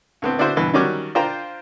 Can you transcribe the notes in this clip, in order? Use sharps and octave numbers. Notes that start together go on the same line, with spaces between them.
D2 B3 C4
B3 D4 E4 F#4 C5
G2 B2 E3
D#3 F#3 G3 C#4 F#4 D6
D4 F4 A#4 C5 G5 A#5